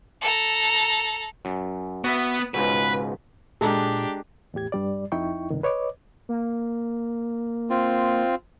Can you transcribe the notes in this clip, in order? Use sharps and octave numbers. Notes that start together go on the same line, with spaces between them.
A4 A#5
F#2
B3 F#4 B4 E5
C#2 G#2 B2 B4
A#2 G#3 D4 G4 A4 A#5
E2 A2 G4 G#6
G2 G3 D5
F2 D#4 E4 G5 C#6
C#2 G2 C3 D#3
B4 C#5 D#5 D6
A#3
C4 F4